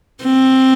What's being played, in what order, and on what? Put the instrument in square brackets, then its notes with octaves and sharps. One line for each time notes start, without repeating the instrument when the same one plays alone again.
[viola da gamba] C4